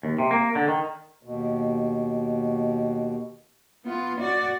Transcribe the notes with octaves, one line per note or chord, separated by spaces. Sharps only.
D#2
C3
A#3
D3
D#3
D#2 B2
B3 F4
F#4 D5